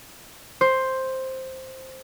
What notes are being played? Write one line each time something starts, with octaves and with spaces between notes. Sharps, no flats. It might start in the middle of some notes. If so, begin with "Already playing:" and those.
C5